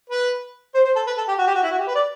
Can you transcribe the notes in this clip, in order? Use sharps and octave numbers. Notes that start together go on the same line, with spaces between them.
B4
C5
C5
A4
B4
A4
G4
F#4
G4
F#4
E4
F#4
G4
B4
D5